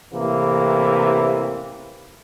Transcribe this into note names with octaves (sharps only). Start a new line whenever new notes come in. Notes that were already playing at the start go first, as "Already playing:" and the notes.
A1 C3 E3 A#3